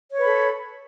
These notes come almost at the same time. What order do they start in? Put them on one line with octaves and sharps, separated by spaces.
C#5 B4 B5 A4